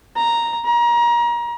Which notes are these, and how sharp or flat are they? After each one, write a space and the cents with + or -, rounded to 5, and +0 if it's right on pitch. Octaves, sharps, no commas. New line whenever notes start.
A#5 +0
A#5 +30